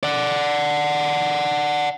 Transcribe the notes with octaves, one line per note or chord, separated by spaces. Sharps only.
D5 F#5